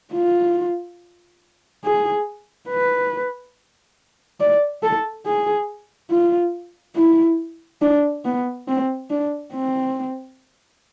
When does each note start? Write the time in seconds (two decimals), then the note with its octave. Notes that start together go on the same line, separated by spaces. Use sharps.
0.14 F4
1.85 G#4
2.69 B4
4.40 D5
4.83 A4
5.26 G#4
6.11 F4
6.96 E4
7.82 D4
8.25 B3
8.68 C4
9.10 D4
9.52 C4